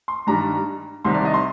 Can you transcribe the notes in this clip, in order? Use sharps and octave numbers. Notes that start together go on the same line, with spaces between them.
C6
G2 D#3 G3 D4 A#5
C2 C3 D#3 C6
D5
D#5
C6